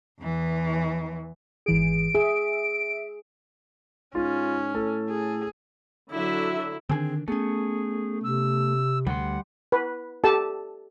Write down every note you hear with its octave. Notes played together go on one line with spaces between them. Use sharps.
E2 E3
G#1 E3 G#4 D7
G#4 E5
G#2 C#4 F4
A2 A4
G#4
D3 F#3 E4 E5
D3 D#3 C4 D4 G#4 G#5
A3 B3 C#4 G#4
C3 E6
D2 G3 F#5 C6
B4
G4 A4 A5